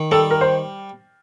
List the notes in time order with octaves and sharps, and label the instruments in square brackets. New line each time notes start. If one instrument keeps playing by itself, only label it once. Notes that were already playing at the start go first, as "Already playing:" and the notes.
Already playing: [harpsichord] D#3
[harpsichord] G3 [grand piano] A4
[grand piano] A#4
C5